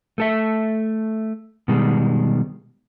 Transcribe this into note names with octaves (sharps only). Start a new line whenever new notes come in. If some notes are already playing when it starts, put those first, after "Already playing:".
A3 A4 E5
B2 D#3 G3 G#3